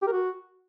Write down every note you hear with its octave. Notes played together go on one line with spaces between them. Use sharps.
G4
A#4
F#4